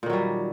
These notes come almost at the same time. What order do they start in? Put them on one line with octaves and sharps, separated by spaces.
A#2 D#3 F#3 G3